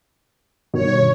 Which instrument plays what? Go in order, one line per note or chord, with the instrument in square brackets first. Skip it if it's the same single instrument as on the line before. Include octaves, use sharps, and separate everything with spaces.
[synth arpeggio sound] G2 B2 D#3 [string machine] C#5